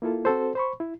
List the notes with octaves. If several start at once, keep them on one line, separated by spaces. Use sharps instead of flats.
A#3 E4 F4 A4
C4 F#4 A4 C5
C5 B5 C#6
E4